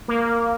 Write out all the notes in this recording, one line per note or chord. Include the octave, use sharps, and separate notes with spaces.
A#3